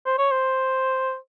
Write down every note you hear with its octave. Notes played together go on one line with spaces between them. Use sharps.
C5
C#5
C5